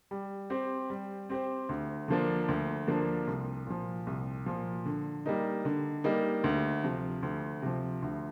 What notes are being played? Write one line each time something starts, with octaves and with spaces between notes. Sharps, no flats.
G3
C4 G4 C5
G3
C4 G4 C5
D2
D3 F3 A#3 D4
D2
D3 F3 A#3 D4
C2
A#2 F3
C2
A#2 F3
D3
G3 A#3 D#4
D3
G3 A#3 D#4
D2
C3 F3
D2
C3 F3
D2